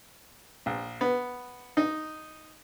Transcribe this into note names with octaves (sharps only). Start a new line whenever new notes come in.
A#1
B3
D#4